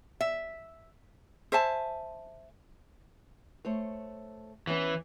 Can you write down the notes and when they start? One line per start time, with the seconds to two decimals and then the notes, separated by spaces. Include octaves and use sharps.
0.21 E5
1.52 C5 E5 G#5 A5
3.65 A3 C5 C#5
4.67 E3 B3 C#4 D#5